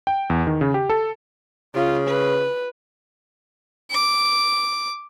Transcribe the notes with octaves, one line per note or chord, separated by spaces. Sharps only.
G5
E2
D#3
C#3
G4
A4
C#3 F4
B4
D6